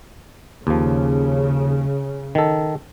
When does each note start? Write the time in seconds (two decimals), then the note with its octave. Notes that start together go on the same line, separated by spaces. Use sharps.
0.67 D#2 C#3 F3
2.35 D#3 A4